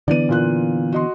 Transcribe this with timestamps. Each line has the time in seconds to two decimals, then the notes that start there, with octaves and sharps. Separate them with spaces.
0.08 D3 E3 B3 D5 D#7
0.29 A#2 F4 F#6
0.92 F#4 D#5 C6